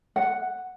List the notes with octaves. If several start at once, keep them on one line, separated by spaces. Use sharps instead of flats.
F#5